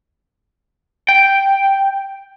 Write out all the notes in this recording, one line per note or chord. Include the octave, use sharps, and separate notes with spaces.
G5